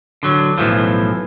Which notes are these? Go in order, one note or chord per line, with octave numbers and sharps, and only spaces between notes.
D3 F#3
B1 A2 E3 F3